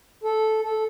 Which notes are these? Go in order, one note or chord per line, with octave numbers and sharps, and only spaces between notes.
A4
A4